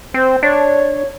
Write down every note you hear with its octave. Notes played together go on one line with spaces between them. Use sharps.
C4 C5
D4 C#5